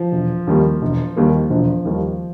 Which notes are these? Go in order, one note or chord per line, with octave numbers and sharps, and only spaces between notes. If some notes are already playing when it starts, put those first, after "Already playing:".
Already playing: F3
E1
D#2 D#3 G3 A#3
E1
D#2 D#3 G3 A#3
E1 F3
D#2 D#3 G3 A#3